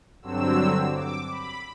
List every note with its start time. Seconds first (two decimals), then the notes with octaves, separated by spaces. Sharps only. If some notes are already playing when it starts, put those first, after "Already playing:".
0.22 G2 D3 F#3 C4 E6
0.94 D6
1.30 B5